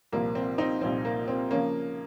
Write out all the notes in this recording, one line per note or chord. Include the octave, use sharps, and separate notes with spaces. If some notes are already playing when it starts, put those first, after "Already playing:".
C2 A#2 F3 A#3
C4
C4 D#4
C2 A#2 F3 C4
A#3
C4
C#3 F3 A#3 C#4